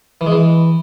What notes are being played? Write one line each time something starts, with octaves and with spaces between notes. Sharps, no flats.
E3
G#3
E3